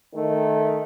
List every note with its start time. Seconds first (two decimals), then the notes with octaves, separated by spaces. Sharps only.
0.15 D#3 A3